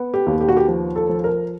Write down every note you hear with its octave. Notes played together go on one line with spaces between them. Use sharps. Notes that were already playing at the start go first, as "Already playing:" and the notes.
Already playing: B3
G4
D#2
G4
F#4
G4
F3
A4
F3
A#4